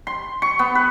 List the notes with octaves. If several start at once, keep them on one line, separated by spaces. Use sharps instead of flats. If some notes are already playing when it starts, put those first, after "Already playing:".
C6
C#6
B3
B4